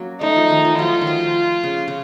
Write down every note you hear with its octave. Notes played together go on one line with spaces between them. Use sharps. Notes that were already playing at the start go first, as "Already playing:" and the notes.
Already playing: F#3 A#3 C#4
A3 D#4
F3
D#3
F3
F#3 F4
D#3
F3
C#3
C#3